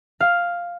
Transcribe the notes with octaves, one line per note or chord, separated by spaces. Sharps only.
F5